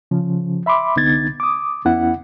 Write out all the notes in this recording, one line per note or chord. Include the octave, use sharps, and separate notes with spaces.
C#3 F3 C#4
E5 B5 C6 D6
C2 D3 B3 D#4 G#6 A6
D6 D#6
E2 B3 C#4 E4 F#5